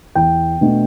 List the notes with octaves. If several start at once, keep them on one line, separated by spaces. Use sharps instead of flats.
E2 G5
B2 A3 D4